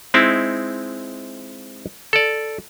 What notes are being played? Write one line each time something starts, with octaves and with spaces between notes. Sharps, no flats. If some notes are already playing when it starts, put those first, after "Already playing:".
G#3 C4 D#4 E4
A4 D5